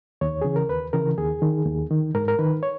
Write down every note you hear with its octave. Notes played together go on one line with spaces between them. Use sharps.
D#2 C#5
C#3 E3 G#4
A#4
D#2 B4
C#3 E3 A#4
D#2 G#4
D#3
D#2
D#3
G#2 A#4
A#4
D#3 B4
C#5